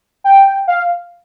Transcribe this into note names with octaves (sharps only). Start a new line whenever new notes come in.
G5
F5